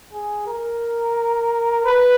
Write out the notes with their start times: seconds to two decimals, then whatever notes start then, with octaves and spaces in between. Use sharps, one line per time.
0.13 G#4
0.47 A#4
1.85 B4